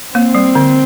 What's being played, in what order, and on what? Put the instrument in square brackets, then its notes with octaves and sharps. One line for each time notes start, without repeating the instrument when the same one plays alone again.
[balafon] A#3 [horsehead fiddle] C4
[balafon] G3
D3